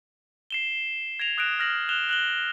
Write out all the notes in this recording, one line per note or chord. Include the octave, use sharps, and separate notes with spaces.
C7 E7 G7
G#6 A#6 D7 F7
D#6 F#6 A#6 D7 E7
F6 A#6 F#7
F#6 E7 F7 G7
F#6 F#7 G7